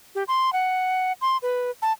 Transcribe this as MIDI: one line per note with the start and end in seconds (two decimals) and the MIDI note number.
0.15 0.23 67
0.28 0.53 84
0.53 1.12 78
1.21 1.37 84
1.42 1.71 71
1.82 1.92 81